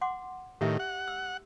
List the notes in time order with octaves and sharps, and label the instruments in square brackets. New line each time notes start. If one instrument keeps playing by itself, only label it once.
[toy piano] F#5 C6 D6
[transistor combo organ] A2 D#3 [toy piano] G4 E5
[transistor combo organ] F#5
[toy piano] E6